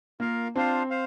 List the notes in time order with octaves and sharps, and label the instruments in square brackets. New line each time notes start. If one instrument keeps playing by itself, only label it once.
[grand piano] A#3 [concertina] F4 A#4 F5
[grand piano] C4 [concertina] D4 F4 C5 F5
[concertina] C5 F5